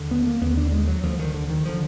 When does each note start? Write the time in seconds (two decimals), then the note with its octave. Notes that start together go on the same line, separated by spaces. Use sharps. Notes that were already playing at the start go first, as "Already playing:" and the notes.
Already playing: D#2 D3
0.11 B3
0.26 A#3
0.41 D#2 D3 B3
0.57 D4
0.72 G#3
0.88 F#3
1.03 D2 D3 F3
1.19 D#3
1.34 D3
1.50 D#3
1.65 D3 F3